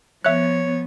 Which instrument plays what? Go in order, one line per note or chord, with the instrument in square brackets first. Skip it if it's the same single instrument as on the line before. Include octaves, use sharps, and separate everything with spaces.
[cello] F3 B3 [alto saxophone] C#5 [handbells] E5 F#6